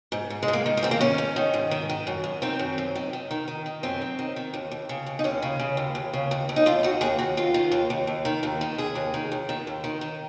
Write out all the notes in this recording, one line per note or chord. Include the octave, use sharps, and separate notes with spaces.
G#2
G#2
G#3
G#2
A#3
D#3
A#3
G#2 C4
A#3
G#2 C#4
G#2
D#3
G#2
D#3
D#3
F#2
F#2
D#3 C4
F#2
F#2
D#3
D#3
D#3
D#3
D#3
F#2 C4
D#3
D#3
D#3
D#2
D#2
C#3
D#2
D#4
D#2 C#4
C#3
C#3
D#2
D#2
C#3
D#2
D#2
D#4
D#2 F4
D#2 F#4
D#2 G#4
D#2 F#4
D#2 F4
D#3
D#2
D#2
D#2
D#3
D#2
D#3
D#2 G#4
D#2
D#3
D#2
D#3
D#2
D#3
D#3